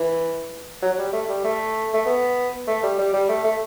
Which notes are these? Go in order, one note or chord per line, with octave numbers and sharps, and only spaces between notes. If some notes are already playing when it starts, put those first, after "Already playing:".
Already playing: E3
F#3
F#3
G3
A3
G3
A3
A3
B3
A3
G3
G3
G3
A3
A3